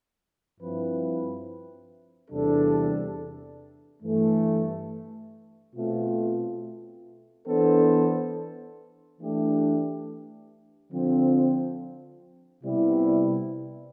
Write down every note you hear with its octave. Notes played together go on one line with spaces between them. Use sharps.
G2 F3 C4 E4 B4
E2 C3 G3 D4 A4
G2 E3 A3
B2 A3 C4 F4
E3 B3 D4 A4 C5
E3 A3 D4 G4
D3 F3 C4
C3 G3 B3 E4